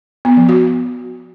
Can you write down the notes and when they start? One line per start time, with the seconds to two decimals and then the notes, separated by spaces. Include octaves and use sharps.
0.25 B3
0.37 F3
0.49 F#4